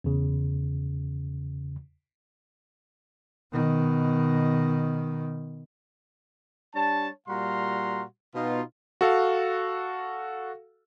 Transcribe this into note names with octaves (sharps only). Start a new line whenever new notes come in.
E2 C#3
B2 D#3
G3 D4 C#5 A5
A#2 G3 F#4 F5 A#5 C6
B2 D#4 F4
F#4 A4 F5